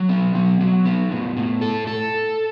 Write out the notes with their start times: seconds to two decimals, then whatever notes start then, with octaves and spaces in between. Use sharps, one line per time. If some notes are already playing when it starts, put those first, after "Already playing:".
Already playing: F#3
0.09 B3
0.35 F#3
0.60 F#3
0.86 B3
1.11 A2
1.37 A2
1.61 A4
1.87 A4